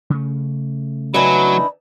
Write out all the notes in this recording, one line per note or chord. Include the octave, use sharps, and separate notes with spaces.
C#3 A3
E3 F#3 D4 D#4 B5